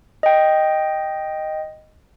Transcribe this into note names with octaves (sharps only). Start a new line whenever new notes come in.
D#5 G5